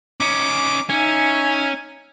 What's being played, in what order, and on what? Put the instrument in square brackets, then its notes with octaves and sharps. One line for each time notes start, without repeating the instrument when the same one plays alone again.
[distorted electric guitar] C#4 D#4 [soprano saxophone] D6
[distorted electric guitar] C#4 [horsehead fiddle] D#4 E5 [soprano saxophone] G#5